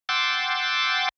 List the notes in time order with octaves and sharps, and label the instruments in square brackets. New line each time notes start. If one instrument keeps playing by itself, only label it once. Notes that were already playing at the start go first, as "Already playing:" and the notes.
[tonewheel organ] F#5 G5 C6 D6 E6 A6